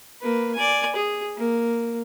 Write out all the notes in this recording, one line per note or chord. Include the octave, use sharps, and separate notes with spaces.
A#3 B4
D5 G#5
G#4
A#3